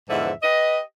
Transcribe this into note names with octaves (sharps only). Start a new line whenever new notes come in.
E2 G#2 D3 F3 E5
G4 B4 D#5